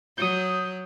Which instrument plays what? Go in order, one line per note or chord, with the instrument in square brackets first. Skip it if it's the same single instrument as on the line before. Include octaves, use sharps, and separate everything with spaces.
[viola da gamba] F#3 [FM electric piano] D#6 G6